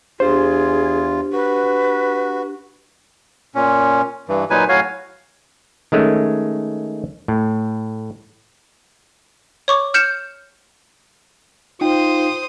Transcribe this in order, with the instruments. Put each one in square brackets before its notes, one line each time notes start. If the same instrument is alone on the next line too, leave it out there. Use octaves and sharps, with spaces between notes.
[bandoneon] E2 F4 [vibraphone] D4 G4 [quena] G#4 [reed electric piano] C5
[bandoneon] F#4 [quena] B4
[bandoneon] A#2 C#4
G2 E3
A#2 F#3 D#4 B4 G#5
A2 F#3 F#4 C#5 F5 G#5
[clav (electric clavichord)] D#3 G#3 A3 C#4
A2
[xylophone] C#5 C#6 D6
F6 G6 C#7 E7
[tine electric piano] D#4 G5 [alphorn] F4 [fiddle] C5 D#6